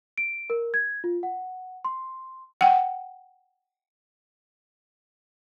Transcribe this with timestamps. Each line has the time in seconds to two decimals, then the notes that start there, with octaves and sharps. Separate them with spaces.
0.18 D7
0.50 A#4
0.74 G#6
1.04 F4
1.23 F#5
1.85 C6
2.61 F#5 G5